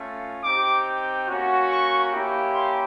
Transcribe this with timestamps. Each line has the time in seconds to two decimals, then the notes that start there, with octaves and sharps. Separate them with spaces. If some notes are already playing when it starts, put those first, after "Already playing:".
Already playing: A3 C#4 F4
0.43 C4 D#4 G4 D6
1.28 A#3 C#4 F#4
1.70 C#6
2.12 A#3 C#4 E4 G4
2.54 C6